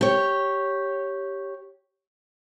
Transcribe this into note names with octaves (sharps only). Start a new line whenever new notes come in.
G4 C#5